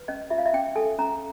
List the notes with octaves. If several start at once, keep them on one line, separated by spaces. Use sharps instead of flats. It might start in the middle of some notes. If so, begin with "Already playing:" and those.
Already playing: B4
C#4 D#5
F4 E5
F5
E5
C#4 G5
A4 G#5
C#4 A#5